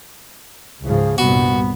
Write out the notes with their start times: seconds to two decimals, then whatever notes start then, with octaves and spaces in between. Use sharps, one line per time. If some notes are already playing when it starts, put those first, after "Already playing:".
0.82 C#2 G#2 C#3 F3
1.18 C2 G2 A#2 B3 F#4